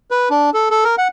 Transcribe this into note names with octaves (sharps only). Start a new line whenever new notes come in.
B4
D4
A4
A4
A#4
F#5